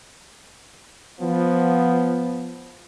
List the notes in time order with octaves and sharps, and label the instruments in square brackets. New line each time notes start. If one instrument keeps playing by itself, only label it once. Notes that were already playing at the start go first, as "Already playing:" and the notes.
[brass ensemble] F3 B3